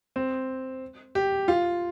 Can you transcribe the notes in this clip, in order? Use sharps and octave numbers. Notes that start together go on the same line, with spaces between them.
C4
G4
F4